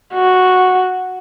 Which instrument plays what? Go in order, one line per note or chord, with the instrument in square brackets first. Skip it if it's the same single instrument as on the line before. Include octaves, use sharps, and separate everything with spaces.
[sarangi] F#4